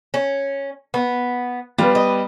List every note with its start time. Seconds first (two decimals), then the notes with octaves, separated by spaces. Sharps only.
0.14 C#4
0.94 B3
1.78 G3 B3 F4
1.95 D#5